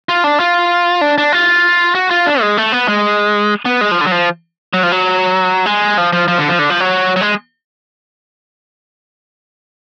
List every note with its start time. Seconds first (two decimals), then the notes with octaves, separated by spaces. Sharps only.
0.09 F4
0.24 D4
0.40 F4
1.01 D4
1.18 D4
1.32 F4
1.95 F#4
2.11 F4
2.26 D4
2.41 G#3
2.57 A3
2.72 B3
2.88 G#3
3.65 B3
3.81 G#3
3.91 F3
4.01 D3
4.07 F#3
4.12 F3
4.74 F#3
4.83 F3
4.92 F#3
5.66 G#3
5.98 F3
6.13 F3
6.28 F3
6.38 D3
6.49 F3
6.59 D3
6.70 F3
6.80 F#3
7.16 F#3
7.21 G#3